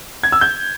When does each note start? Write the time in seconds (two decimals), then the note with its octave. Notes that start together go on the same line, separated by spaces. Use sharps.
0.23 G#6
0.32 E6
0.41 G6